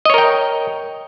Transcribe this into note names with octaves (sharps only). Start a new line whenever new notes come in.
A#4 C#5 D#5 G5